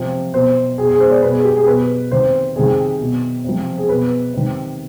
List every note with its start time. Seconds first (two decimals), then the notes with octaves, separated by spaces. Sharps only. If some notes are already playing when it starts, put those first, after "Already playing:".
Already playing: C3 F3
0.33 B2 C5
0.78 B2 G#4
0.89 G#4
1.00 C5
1.12 D5
1.22 B2 B4
1.33 G#4
1.45 G4
1.56 G#4
1.67 B2 B4
2.11 C3 D#3 C5
2.56 C3 D#3 G#4
3.00 B2
3.44 C3 F3
3.78 G#4
3.89 B2 B4
4.33 C3 D#3